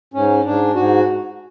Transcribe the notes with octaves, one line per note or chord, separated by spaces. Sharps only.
G#2 C#4
G#2 D4
G#2 F#4